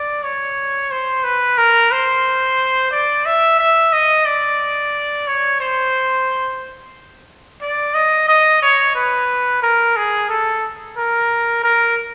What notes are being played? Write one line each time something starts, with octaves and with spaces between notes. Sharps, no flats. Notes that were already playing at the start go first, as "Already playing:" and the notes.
Already playing: D5
C#5
C5
B4
A#4
C5
D5
E5
E5
D#5
D5
C#5
C5
D5
D#5
D#5
C#5
B4
A#4
G#4
A4
A#4
A#4